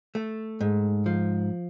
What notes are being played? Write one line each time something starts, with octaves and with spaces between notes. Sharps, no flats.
A3
G#2
F3